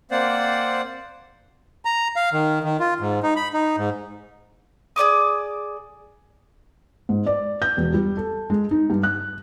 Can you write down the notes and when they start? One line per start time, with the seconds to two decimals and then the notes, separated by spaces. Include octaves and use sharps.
0.11 A#3 C4 C5 D5 F#5
1.85 A#5
2.16 F5
2.33 D#3
2.64 D#3
2.80 F4
3.00 G#2
3.23 D#4
3.36 B5
3.54 D#4
3.77 G#2
4.96 G#4 D5 D6 D#6
7.09 G#2
7.27 D5
7.62 G6
7.77 E1
7.94 G3
8.17 A4
8.50 G#3
8.71 D#4
8.90 G2
9.03 F#6